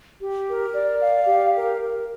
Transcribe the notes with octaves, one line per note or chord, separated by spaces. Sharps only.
G4
A#4
D5
F5
G4
A#4
A#4